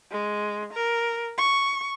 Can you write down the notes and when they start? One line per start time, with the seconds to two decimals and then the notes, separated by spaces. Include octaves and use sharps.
0.12 G#3
0.73 A#4
1.38 C#6